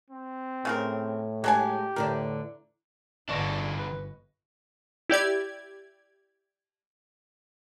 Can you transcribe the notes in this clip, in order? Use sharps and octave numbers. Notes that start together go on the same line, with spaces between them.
C4
A2 C#3 F4 A#4
F#3 G#3 D4 G4 G#5
E2 A2 D3 D4 A#4
G1 E3 D4 D5 D#5 C#6 A#6
B4
E4 G4 D5 G#6